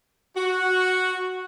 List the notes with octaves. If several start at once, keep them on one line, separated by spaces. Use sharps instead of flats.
F#4